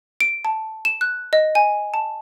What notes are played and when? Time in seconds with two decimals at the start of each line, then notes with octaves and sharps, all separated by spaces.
0.20 D7
0.45 A5
0.85 E7
1.01 F#6
1.33 D#5
1.55 G#5
1.94 A5